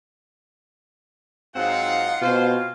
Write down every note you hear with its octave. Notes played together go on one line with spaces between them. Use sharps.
G#2 F#3 C4 D#4 F4 F5 F#5
B2 C4 C#4 F4 C5